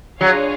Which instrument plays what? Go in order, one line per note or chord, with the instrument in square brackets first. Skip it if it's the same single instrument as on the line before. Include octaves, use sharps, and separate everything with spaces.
[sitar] F#3 [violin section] D4 F4 G#4 C#5 F5